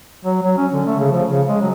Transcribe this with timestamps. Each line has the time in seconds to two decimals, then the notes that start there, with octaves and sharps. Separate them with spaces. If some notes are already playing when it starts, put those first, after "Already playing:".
0.25 F#3
0.42 F#3
0.57 C#4
0.73 D3
0.87 A3
0.99 C#3
1.11 F3
1.31 C#3
1.49 G#3
1.61 F#3